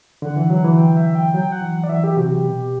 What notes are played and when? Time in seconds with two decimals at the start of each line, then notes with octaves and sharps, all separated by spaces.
0.22 D3 F#5
0.36 E3
0.50 F#3
0.64 E3
0.78 G5
0.97 E5
1.15 G5
1.34 F#3 G5
1.52 F#5
1.62 E3
1.71 F#5
1.84 D5
1.89 E3 E5
2.04 G4
2.17 C3 F#4
2.32 G4
2.45 B2